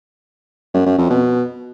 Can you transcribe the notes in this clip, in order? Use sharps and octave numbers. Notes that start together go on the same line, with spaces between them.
F#2
F#2
F2
B2